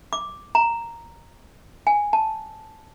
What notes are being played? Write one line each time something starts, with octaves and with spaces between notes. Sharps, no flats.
D6
A#5
G#5
A5